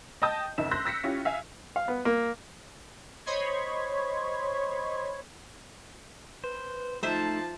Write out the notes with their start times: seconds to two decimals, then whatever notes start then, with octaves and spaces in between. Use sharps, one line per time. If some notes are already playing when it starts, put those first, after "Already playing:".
0.22 D#5 G5 A5 D#6 G6
0.58 F#1 F2 D#4 E5 E7
0.71 C6 E6 F#6 G6 A#6 B6
0.85 E6 A#6 B6 C#7
1.04 C#4 E4 F4 G4
1.25 E5 F5 G#5
1.76 F5
1.88 B3
2.05 A#3
3.26 C5 C#5 D#5 B5 C6 G#6
6.44 B4 C5
7.03 F3 A3 D#4 C5 E5 A5